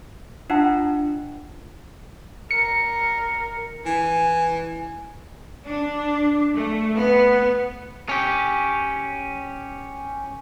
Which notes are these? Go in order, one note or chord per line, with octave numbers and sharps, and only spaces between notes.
D4 F4 D#5 F#5 A5
A#4 C#7
E3 G#5
D4
A3
B3
C#4 G4